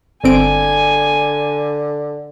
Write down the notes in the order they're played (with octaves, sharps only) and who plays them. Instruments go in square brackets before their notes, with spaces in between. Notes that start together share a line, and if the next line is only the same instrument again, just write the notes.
[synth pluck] G1 C4 D7 [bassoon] D3 [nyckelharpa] G#5